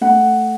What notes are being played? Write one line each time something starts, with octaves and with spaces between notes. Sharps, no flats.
A3 F#5